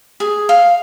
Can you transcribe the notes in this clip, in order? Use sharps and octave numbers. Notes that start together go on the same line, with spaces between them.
G#4
F5